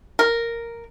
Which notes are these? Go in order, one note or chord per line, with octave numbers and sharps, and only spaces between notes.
A#4